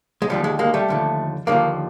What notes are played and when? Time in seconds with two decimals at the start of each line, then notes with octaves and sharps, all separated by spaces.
0.22 G#3
0.30 D#2 D3 F3 G3
0.44 G#3
0.59 G#3 A#3
0.74 G3 A3
0.88 D#2 D3 F3
1.47 D#2 D3 F3 G#3 A#3